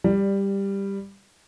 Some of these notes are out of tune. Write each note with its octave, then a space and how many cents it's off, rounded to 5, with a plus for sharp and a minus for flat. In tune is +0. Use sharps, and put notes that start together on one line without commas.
G3 +10 D5 +0